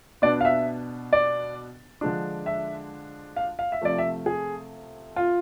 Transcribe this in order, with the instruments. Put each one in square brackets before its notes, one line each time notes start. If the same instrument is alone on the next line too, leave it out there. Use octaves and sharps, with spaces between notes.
[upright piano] B2 B3 D4 D5
F5
E5
D5
D3 F3 G#3 D4
E5
F5
F5
E5
C3 F3 A3 D5
E5
G#4
F4